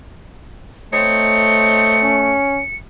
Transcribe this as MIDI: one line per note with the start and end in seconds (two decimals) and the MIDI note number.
0.93 2.39 57
0.93 2.15 60
0.93 2.15 63
0.93 2.15 73
0.93 2.76 97
2.03 2.60 61